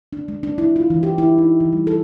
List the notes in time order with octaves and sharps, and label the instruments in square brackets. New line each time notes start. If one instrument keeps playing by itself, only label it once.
[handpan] D4
G#3
D4
E4
F4
E3
G4
E4
D#4
E3
G3
A4